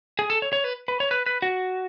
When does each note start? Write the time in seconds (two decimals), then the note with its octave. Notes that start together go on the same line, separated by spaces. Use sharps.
0.19 G#4
0.30 A4
0.42 C#5
0.53 C#5
0.64 B4
0.88 B4
1.00 C#5
1.11 B4
1.26 B4
1.42 F#4